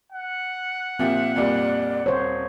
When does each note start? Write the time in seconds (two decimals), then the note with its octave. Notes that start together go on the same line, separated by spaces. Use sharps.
0.12 F#5
0.99 A#2 F3 C4 G4 E5
1.36 F2 A#2 G3 D5
2.06 D#1 C5 C#5